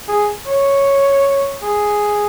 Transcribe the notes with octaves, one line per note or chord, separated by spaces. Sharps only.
G#4
C#5
G#4